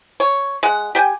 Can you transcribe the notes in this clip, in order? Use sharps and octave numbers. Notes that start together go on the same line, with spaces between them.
C#5
G#3 F#5
G4 G5 G#5